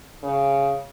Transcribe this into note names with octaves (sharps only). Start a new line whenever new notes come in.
C#3